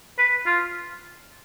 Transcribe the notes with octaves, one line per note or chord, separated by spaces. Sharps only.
B4
F4